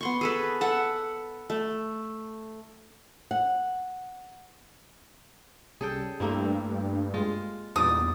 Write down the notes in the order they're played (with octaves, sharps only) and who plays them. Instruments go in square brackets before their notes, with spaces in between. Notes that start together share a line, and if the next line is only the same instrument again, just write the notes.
[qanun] B3 C6 C#6
G#4 A4 B4
A4 E5 F#5 A5
A3
[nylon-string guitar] F#5
[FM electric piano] C2 G3 C#4 [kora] G#4 A4 G5
[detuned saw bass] G2 [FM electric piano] G3 A3 [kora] A#3 C4 E4
[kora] G#3 F4
[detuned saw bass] E2 [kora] G2 A#2 D5 [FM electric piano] D#4 [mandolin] D#6